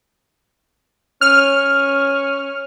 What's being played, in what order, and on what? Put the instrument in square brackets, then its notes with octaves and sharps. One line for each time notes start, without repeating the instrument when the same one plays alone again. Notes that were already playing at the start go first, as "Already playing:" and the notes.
[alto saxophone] C#4 [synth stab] F6